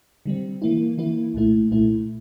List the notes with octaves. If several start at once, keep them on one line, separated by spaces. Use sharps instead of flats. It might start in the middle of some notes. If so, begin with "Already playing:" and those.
D3 G3 C4
E3 A#3 E4
E3 A#3 E4
C2 A#2 A3 E4
C2 A#2 A3 E4